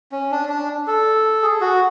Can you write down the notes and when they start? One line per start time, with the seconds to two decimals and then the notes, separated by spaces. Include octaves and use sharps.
0.12 C#4
0.31 D4
0.49 D4
0.87 A4
1.43 G#4
1.61 F#4